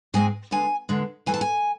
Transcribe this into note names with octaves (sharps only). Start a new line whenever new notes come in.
G#2 G#3 C4 G#5
E2 D3 G#3 G#5
E2 D3 G#3
F2 E3 A3 C4 G#5
A5
G#5